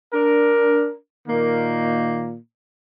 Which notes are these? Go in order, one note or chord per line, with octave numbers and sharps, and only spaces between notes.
D4 A#4
A#2 D#3 A#3